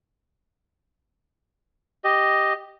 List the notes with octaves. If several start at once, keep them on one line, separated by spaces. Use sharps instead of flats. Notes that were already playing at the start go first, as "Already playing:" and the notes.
G4 D#5